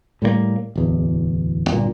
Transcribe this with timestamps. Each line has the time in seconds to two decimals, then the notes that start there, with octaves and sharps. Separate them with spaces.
0.22 A2 G3 G#3 A#3
0.75 D1 E2
1.70 G1 G2 A#2